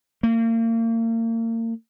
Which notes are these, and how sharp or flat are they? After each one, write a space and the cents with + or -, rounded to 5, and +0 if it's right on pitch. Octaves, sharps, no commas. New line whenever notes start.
A#3 -35